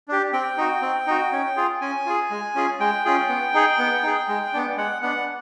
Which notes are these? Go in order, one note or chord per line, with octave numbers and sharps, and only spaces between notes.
D4 G4
C4 G5
D#4 F#4
C4
D#4 F#4
C#4
F4 G#4
C#4 G#5
F4 G#4
G#3
C#4 F4 G#4
G#3 G5
C#4 F4 G#4
B3
D#4 G#4
B3
D#4 G#4
G#3
B3 D4
G#3 F#5
B3 D4 F#5